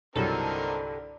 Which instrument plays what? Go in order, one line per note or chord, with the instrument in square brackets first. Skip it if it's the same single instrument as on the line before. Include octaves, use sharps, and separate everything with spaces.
[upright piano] C2 G2 F#3 [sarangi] D3 [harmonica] C4 D#4 A#4 [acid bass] A4